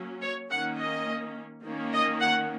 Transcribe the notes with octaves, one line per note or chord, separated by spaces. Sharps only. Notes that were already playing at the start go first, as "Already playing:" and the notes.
Already playing: F#3 A#3 C#4
C#5
D#3 A#3 C#4 F#5
D#5
D#3 A#3 C#4
D#5
F#5